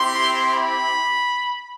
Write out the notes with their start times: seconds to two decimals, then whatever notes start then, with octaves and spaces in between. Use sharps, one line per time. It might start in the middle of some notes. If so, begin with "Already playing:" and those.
Already playing: C4 E4 G4 C6
0.50 B5